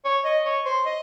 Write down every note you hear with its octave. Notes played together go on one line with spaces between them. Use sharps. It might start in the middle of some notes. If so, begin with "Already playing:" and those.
C#5
D#5
C#5
C5
D#5